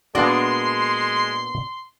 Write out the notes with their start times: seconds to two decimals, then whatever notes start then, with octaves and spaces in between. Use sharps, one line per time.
0.15 A#2 G#3 B3 D4 F#4 D5 C6